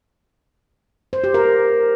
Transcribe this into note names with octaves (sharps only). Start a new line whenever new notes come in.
C5
G4
A#4